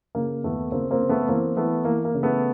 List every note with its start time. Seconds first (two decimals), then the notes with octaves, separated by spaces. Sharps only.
0.15 C#3 A#3
0.43 D#2 A3 B3
0.72 C#3 A#3 C4
0.91 A#3 C4
1.00 C#3
1.09 A3 B3
1.29 E3 A#3 C4
1.56 E3 A3 B3
1.85 E3 A#3
2.05 A#3
2.14 C#3
2.23 A3 B3